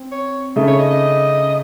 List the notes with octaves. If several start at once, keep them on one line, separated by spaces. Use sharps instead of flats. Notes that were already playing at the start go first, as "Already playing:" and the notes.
Already playing: C4
C#5
C#3 A3 D#4
C#5
D#5
D#5